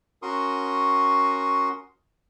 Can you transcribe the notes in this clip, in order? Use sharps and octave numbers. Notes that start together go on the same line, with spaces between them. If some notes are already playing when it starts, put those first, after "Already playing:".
C#4 F#4 A#4 C6 C#6 D#6